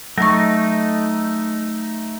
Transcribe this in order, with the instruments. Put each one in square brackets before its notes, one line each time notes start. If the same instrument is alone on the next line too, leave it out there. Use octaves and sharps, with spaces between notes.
[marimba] F#3 C#6 [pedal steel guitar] A3 D#4